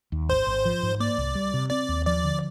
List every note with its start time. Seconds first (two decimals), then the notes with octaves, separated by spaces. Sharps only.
0.12 D#2
0.29 G#1 C5
0.47 G#1
0.65 F3
0.83 G#2
1.00 A#3 D5
1.18 C2
1.35 G3
1.54 C3
1.71 C4 D5
1.89 D#2
2.06 F3 D5
2.25 D3